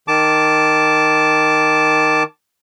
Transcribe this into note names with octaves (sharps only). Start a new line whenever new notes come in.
D#3 A5 D6